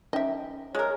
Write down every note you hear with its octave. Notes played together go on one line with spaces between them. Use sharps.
C#4 D#4 D#5 E5 G5
G#3 A#4 C#5